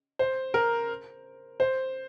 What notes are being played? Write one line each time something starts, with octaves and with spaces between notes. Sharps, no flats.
C5
A#4
C5